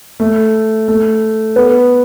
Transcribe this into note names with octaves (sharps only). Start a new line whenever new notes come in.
A3
A3
B3